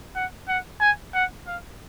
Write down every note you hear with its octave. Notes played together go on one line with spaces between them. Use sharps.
F#5
F#5
G#5
F#5
F5